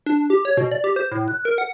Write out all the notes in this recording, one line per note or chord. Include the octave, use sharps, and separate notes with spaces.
D4
G4
C#5
B2
D5
G4
C5
A2
F#6
A#4
F#5